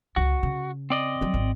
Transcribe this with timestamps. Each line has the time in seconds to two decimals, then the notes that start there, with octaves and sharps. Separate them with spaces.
0.16 C#2 D3 F#4
0.43 C#3
0.90 C4 D5 D#5
1.21 F#3 G3
1.34 G#1